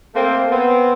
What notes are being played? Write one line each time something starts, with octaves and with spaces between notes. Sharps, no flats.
A3 A#3 C4
B3 C4